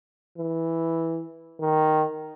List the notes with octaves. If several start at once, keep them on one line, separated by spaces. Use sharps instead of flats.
E3
D#3